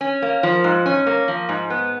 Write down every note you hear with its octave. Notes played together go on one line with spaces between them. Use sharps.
C#4
A#3
F3
G#2
C#4
A#3
F3
G#2
B3